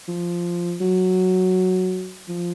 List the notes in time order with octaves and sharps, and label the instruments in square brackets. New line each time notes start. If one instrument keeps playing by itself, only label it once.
[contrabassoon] F3
F#3
F3